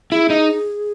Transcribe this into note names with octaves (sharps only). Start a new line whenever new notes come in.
E4 G#4
D#4